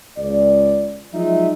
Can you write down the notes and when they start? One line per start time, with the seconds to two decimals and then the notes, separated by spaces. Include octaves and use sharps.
0.18 C#2 D5
1.14 F3 F#3 G#3 D#4 E5